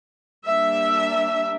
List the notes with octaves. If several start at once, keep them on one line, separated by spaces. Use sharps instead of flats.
G3 A#3 D4 E5